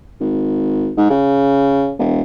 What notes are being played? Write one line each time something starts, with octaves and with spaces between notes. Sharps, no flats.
G#1
G#2
C#3
E1